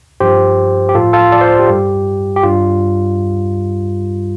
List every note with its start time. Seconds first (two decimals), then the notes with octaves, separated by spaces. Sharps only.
0.20 G2 F3 G4 C5
0.89 G4
0.95 A2 F3 F4 A4
1.13 F4 A4
1.32 A4 D5
1.41 C5 F5
1.60 G4
1.69 G2 G3
2.36 G4
2.43 G2 G3 F4